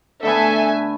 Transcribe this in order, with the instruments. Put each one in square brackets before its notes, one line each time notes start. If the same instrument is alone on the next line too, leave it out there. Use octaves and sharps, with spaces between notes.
[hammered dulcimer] D3 A3 B3 [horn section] A4 [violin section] E5 G#5